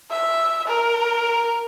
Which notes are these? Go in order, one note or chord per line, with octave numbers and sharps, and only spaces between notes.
E5
A#4